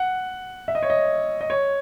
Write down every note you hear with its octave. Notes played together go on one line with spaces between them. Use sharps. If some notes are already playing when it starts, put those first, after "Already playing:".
Already playing: F#5
E5
D#5
C#5
D#5
D#5
C#5